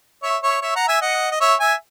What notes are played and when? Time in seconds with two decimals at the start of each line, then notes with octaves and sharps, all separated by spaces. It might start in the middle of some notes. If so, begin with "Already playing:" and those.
0.23 C#5 E5
0.43 C#5 E5
0.62 C#5 E5
0.76 F#5 A#5
0.88 E5 G#5
1.01 D#5 F#5
1.31 D#5
1.41 C#5 E5
1.60 E5 G#5